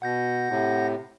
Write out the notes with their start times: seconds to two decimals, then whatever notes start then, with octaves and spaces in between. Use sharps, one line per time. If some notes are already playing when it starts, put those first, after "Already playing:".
0.02 B2 F#5 G6 A#6
0.50 A2 C3